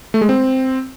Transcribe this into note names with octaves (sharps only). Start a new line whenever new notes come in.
A3
G#3
C4